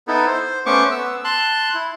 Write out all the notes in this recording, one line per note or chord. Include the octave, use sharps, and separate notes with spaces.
B3 D#4 E4 A4
C5
A3 B3 C#4 C5 C#6 D6
B3 E6
A5 C6 F#6
E4